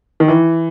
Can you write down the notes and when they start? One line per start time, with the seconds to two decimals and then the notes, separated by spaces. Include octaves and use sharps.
0.20 D#3
0.28 E3